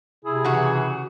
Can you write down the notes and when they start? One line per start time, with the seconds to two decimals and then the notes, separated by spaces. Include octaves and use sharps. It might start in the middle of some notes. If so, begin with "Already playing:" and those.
0.25 C3 E4 G#4
0.44 C#3 E3 F#4